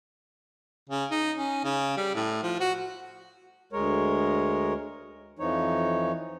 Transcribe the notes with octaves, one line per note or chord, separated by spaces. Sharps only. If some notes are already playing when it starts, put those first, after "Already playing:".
C#3
D#4
C#4
C#3
G3
A2
F3
F#4
D2 G#3 A#4 C#5
F2 E3 F3 D#4 C#5